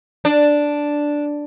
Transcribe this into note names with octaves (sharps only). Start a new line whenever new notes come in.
D4